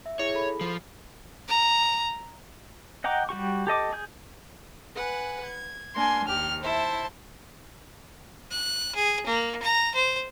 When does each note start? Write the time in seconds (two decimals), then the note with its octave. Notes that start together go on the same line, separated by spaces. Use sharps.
0.06 E5
0.19 E4 G#4 C#5
0.35 A4 B5
0.61 F3
1.48 A#5
3.04 D#5 F#5 G5 A#5 D6
3.29 G3 F#4 G4 C#6
3.67 G4 A4 D#5 D6
3.93 G#4 G6
4.95 B4 F#5 G#5
5.44 G#6
5.95 A#3 D4 G#5 C6
6.27 D#2 G4 F6
6.62 E4 C5 E5 A5
8.51 F#6
8.95 G#4
9.26 A#3
9.62 A#5
9.95 C5